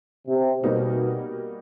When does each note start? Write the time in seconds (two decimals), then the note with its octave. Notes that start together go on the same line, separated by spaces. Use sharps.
0.28 C3
0.64 B2 G3 A#3 D#4 F#4